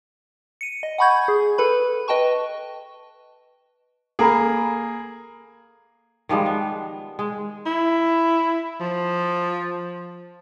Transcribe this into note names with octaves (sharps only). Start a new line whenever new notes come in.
C#7 D#7
D#5
F#5 G#5 B5 C#6 G6 G#6
G#4
A4 B4 B5
B4 D#5 G5 A5 C#6
A#3 G#4 A4 A#5 B5
D#3 F3 G3 G#3
B3
G#3
E4
F3